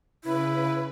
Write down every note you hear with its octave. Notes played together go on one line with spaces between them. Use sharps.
C#3 E4 B4